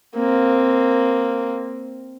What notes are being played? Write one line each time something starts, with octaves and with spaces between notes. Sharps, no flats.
A#3 C4